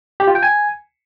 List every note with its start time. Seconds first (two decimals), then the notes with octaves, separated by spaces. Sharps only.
0.20 G4
0.27 F4
0.35 G5
0.43 G#5